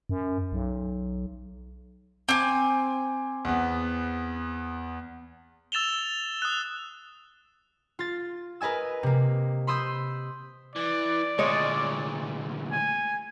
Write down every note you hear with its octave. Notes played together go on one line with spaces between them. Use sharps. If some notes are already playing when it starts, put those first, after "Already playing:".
F#2
B1
C4 G#5 D6
E2 B3
E6 A6 E7 F7 G7
D#6 F#6
F4 A6
A#4 B4 D#5 G#5 E6
C3 A#3
B5 C6 D#6 E6 G6
E3 D5
D2 A#2 G#3 C#5 D#5
G#5